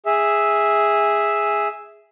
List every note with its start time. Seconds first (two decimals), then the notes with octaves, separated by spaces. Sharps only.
0.06 G#4 E5